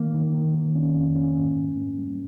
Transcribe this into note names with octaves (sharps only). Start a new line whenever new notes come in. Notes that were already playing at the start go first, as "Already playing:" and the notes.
Already playing: D#3 A#3
D#3
D#3
D#3
C#4
F2
C#4
G#2
G#2
A#3
G3